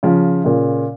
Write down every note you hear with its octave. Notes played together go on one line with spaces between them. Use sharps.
C#3 F3
A#2 C#3